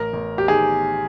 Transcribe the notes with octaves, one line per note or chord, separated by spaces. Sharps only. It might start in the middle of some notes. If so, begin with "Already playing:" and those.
Already playing: A1 A#4
A1
G4
D#3 G#4